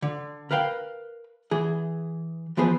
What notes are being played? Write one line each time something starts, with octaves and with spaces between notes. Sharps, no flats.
D3
A#4 B4 F5 G5
E3 G#4
E3 F3 B3 G#4 C5